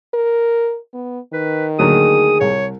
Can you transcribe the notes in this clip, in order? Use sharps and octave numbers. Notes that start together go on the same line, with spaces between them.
A#4
B3
D#3 B4
D2 F#3 A#3 G#4 D#6
C2 C#5